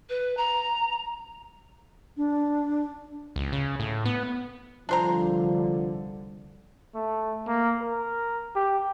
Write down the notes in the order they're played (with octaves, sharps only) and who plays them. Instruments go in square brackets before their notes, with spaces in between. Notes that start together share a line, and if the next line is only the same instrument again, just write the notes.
[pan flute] B4
A#5
[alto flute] D4
[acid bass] C#2
C#3
A2
B3
[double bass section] C2 D3 [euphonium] F3 [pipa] D4 C5 A#5
[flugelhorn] A3
A#3
A#4
G4